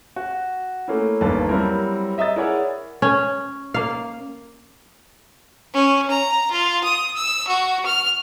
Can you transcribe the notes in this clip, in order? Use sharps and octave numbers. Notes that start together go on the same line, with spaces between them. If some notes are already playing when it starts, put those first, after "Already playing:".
F#4
A3 A#3 C#4 E4
G1 D#2 A#3 B4 A5
F#3 G3 C4 E4 A#4
D#5 E5 A#5 D#6 A6
E4 G#4 A#4 C#5 D5 F#5
C#4
A#3 F5
C#4
A#5
F4
D#6
E6
F#4
F6